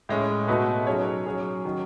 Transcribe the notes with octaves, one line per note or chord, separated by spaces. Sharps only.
A2 G#3 C#4 G#4
B2 A3 D#4 F#4 B4
F#3 C#4 G#4 C#5
F#3 C#4 G#4
D#3 F#3 C#4